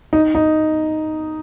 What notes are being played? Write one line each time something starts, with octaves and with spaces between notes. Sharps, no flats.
D#4
D#4